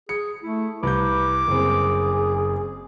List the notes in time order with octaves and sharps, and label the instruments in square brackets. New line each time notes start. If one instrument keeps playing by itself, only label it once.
[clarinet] G#4 [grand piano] C#7
[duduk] A3 [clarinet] E4
[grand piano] C2 G6 [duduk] B4 [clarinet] D6
[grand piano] F#1 C4 [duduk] G#4